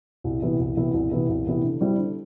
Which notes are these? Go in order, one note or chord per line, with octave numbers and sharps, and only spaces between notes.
C2
C3 E3 B3 E4
C2
C3 E3 B3 E4
C2
C3 E3 B3 E4
C2
C3 E3 B3 E4
D3
G3 C4 E4 G4
D3